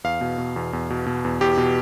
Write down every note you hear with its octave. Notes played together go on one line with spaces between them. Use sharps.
E2 F5
B2
B2
E2
E2
B2
B2
E2
E2 G4
B2